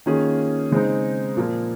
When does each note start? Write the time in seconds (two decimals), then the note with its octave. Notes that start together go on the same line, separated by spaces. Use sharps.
0.06 D#3 A#3 C#4 F4 G#4
0.72 C#3 G#3 C4 D#4
1.37 A#2 F3 A#3